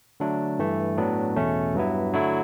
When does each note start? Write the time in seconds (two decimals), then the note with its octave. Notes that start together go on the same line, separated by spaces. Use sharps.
0.20 D3 F#3 A3 D4
0.59 G2 E3 A3
0.98 A2 F#3 B3 D4
1.36 E2 B2 A3 C#4
1.75 G2 F#3 B3 E4
2.13 D3 F#3 A3 E4